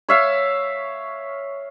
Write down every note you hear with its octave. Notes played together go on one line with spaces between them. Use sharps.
C#5 E5 F5